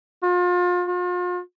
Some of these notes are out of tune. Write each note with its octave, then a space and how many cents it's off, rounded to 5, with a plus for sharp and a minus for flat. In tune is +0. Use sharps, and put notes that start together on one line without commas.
F4 +35
F4 +40